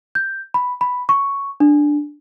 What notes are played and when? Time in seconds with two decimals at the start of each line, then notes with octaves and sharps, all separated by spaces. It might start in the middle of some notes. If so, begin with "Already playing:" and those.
0.15 G6
0.54 B5
0.81 B5
1.09 C#6
1.60 D4